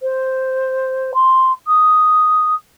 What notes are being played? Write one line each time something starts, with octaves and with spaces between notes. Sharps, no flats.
C5
C6
D#6